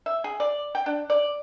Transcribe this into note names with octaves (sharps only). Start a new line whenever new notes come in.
E5
G#4
D5
G5
D4
D5